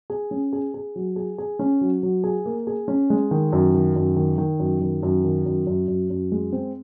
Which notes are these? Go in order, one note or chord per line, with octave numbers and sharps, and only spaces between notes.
G#4
C#4
G#4
G#4
F#3
G#4
G#4
C#4
F#3
F#3
G#4
A#3
G#4
C#4
G#3
D#3
F#2
D#3
F#2
D#3
D#3
F#2
D#3
F#2
D#3
F#2
F#2
F#2
F#2
G#3
C4